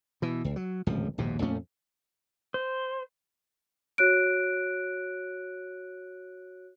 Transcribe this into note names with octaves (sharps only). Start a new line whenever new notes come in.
B2 E3
C#2
F#3
D1 G#1 C#2 F3
A#1 D#2 G#2 B2
F2 A#2 A3 C#4
C5
F#4 C#5 F#6 D7